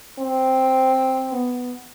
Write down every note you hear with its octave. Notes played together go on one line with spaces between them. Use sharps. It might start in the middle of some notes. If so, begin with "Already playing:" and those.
C4
B3